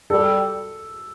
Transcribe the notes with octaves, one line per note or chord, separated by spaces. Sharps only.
G3 A4